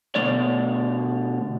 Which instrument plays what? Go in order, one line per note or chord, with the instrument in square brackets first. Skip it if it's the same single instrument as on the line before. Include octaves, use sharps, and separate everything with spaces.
[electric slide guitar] B2 D3 A3 C#5 D5